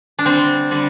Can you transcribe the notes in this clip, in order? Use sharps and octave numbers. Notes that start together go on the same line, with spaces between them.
D4
D3 G3 C4
D3 G3